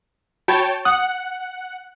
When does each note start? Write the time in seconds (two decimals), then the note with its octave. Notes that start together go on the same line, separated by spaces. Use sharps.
0.48 F#4 C#5 G5 A5 B5
0.85 F#5 D#6